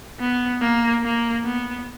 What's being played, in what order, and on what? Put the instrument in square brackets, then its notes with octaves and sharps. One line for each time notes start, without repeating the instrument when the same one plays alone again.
[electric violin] B3
A#3
A#3
B3